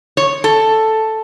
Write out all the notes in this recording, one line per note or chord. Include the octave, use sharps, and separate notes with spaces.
C#5
A4